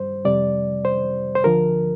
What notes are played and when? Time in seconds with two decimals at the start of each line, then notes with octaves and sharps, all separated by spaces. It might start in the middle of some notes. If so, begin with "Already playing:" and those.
Already playing: G2 G3 C5
0.25 F2 C3 G3 D5
0.85 C5
1.35 C5
1.44 D2 D3 F3 A#4